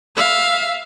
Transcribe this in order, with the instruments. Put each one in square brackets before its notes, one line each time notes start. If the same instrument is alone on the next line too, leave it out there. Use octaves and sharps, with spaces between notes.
[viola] E5 F5